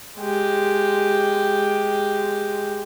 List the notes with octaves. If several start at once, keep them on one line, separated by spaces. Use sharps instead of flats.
G#3 G4